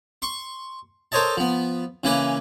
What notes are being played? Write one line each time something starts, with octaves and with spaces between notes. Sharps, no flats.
C6 C#6
A4 A#4 C5 C#5 D#5 A5
F3 B3
C#3 E3 A#3 C#4 B4